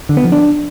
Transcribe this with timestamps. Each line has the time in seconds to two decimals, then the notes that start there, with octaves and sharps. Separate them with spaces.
0.09 D3
0.17 B3
0.24 F3
0.32 D4